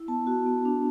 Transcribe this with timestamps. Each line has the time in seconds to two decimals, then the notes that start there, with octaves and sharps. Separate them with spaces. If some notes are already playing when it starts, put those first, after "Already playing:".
Already playing: E4
0.08 B3 A5
0.27 F#4
0.46 B3
0.65 D4